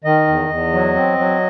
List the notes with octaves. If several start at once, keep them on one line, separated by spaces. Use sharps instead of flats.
D#3 D#5
E2
E2
F#3
C4
F#3